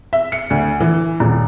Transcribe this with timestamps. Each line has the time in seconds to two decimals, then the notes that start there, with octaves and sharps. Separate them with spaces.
0.13 E5
0.32 C#7
0.50 D2
0.80 E3
1.20 D#1